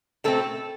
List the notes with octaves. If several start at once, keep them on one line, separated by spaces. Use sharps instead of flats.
B2 A3 C4 A4